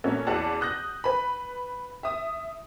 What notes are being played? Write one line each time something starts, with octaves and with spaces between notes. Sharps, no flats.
A#2 A3 C#4 F#4
E2 F#4 D5 F#5 A5
D#6 F#6 G6 A#6
B4 B5
E5 D#6